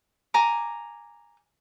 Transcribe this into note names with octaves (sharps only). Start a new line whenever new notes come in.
G#5 A#5 D6